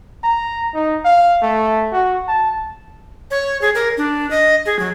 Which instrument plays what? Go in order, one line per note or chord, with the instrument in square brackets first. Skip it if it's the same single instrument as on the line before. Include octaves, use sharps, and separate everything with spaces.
[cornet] A#5
D#4
F5
A3
F#4
A5
[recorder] C#5
G#4
A#4
D4
D#5
G#4
F#3